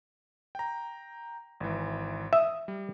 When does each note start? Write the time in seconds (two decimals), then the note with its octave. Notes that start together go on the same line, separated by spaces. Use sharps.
0.55 G5 A#5
1.60 G#1 E3
2.33 E5 D#6
2.68 G3